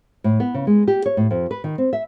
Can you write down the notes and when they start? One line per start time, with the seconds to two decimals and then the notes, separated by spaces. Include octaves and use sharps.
0.24 A2
0.40 B3
0.54 C#3
0.67 G#3
0.88 G4
1.06 C#5
1.17 A2
1.31 F2
1.51 B4
1.64 D#3
1.78 C4
1.93 E5